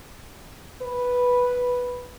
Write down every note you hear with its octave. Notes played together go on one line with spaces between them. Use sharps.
B4